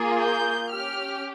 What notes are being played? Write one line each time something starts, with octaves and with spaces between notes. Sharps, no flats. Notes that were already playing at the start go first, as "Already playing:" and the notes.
Already playing: A#3 F4 G#4
G6
C#4 G4 F6